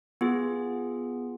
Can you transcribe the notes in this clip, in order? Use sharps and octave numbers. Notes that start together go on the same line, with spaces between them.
B3 F4 G#4